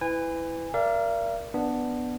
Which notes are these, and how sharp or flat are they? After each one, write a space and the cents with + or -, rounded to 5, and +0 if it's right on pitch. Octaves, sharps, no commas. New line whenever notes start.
E4 +0 B4 +25 G#5 -25
A#4 +5 D5 +0 F5 -45
B3 +0 D4 +0